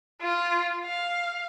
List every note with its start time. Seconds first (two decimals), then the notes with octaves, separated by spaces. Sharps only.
0.22 F4
0.85 F5